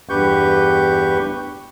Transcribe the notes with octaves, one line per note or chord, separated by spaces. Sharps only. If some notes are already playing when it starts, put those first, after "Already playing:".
E2 G2 G4 B4 C#6 G6